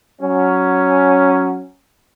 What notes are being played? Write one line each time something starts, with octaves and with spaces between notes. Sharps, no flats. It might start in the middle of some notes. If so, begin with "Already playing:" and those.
F#3 C#4